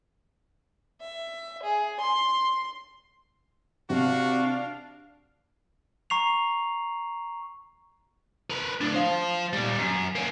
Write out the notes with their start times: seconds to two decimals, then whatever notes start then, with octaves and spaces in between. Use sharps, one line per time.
1.01 E5
1.63 G#4
2.00 C6
3.90 C3 D4 F#4 F5
6.10 A#5 C#6 C7 F7
8.50 A#4 B4
8.81 A2 D4
8.94 C5 F5
9.53 A#2 G3
9.79 F#2
10.15 A#3 C#4